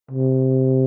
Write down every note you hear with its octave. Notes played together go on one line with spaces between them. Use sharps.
C3